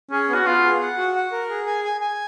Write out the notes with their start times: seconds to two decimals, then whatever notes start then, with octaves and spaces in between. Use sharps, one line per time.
0.11 C#4 G#4
0.29 B3
0.34 F#4
0.46 B3 F4
0.64 G#4
0.81 F#5
0.97 F#4
1.16 F#5
1.32 A#4
1.50 G#4
1.67 G#5
1.84 G#5
2.01 G#5